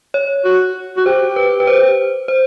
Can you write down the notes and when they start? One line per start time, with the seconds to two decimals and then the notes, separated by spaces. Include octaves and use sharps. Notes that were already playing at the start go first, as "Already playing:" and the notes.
0.14 C#5
0.45 F#4
0.97 F#4
1.06 G4 C5
1.36 B4
1.60 B4
1.67 C5
2.28 C5